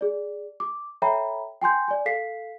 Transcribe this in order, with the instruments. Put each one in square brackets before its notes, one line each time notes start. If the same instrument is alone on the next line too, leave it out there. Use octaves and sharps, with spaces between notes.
[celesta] G#4 D5
D6
A4 C#5 E5 G5 A#5 B5
G5 G#5 C6 G6
D5 G#5
A4 F5 B6 C7